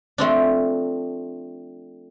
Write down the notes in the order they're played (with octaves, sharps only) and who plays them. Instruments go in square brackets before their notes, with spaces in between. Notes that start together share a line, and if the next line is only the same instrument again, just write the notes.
[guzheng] F3 A3 C4 D4